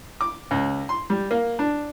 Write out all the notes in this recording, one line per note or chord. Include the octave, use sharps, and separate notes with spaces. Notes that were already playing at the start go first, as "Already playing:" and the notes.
D6
C#2
C6
G3
A#3
D4